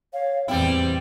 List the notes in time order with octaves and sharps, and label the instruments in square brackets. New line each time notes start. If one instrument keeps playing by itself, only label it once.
[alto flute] C#5 [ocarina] F5
[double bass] E2 A2 [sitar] G3 E4 [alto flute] C4 [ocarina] G5